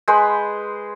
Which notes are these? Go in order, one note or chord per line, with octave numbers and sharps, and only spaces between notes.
G#3 B4 C5